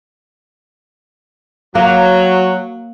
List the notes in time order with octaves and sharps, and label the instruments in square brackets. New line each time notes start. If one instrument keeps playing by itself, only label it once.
[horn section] F#3 [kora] A#3